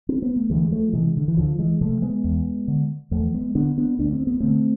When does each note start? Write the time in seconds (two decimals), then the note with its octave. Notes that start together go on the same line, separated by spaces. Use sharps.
0.09 C4
0.22 B3
0.36 A3
0.50 D2 E3 G#3
0.71 F3 A3
0.93 C3 E3 G#3
1.17 D3
1.28 E3
1.37 D2 D3 F3
1.59 E3 G#3
1.81 C3 F3 A3
2.02 G#3 B3
2.24 E2
2.68 D3
3.11 E2 F3 A3
3.34 G#3 B3
3.55 D3 B3 D4
3.78 B3 D4
3.99 D2 D4
4.13 C4
4.27 B3
4.40 D3 A3 C4